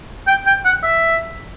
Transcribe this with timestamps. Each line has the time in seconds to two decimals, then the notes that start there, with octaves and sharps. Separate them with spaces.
0.28 G5
0.47 G5
0.66 F#5
0.83 E5